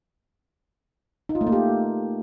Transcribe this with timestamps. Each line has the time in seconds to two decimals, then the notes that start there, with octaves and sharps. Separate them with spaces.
1.29 D#4
1.35 F4
1.41 A3
1.47 A#3
1.52 G4